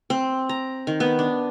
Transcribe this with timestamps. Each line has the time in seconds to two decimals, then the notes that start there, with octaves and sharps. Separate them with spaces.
0.10 C4
0.49 A#5
0.87 D#3
1.00 B3
1.19 D4